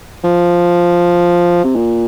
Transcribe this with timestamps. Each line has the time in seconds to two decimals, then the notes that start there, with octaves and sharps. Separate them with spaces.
0.24 F3
1.64 C3
1.76 A#2